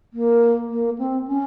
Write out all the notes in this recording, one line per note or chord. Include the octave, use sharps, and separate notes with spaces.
A#3
A#3
C4
C#4